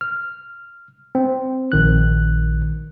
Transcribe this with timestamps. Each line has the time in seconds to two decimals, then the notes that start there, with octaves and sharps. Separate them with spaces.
0.01 F6
1.15 C4
1.72 A#1 D#3 F#6